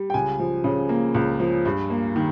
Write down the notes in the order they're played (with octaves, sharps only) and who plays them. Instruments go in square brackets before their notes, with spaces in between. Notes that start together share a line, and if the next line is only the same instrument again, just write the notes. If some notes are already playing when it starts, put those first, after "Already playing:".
Already playing: [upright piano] G3
G5
C#2 G#5
F3
C#3
A#3
C#2
F3
G2
A#3
D#3